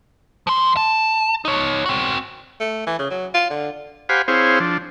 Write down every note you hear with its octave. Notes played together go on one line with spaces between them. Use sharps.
F3 C6
A5
D#4 C#5
C4 F#4
A3
E3
C#3
F#3
F4
D3
G4 C5 F5 F#5 G#5 B5
C4 E4 G#4 C5 C#5 F5
F3 D4